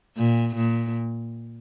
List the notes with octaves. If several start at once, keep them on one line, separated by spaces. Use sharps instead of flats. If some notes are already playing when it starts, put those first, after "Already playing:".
A#2
A#2